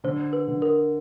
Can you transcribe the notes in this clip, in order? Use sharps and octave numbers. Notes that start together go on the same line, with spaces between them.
D3 C5
B4
D3
A#4